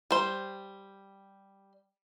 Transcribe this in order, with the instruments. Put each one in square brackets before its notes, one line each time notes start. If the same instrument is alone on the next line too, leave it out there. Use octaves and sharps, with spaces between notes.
[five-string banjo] G3 C5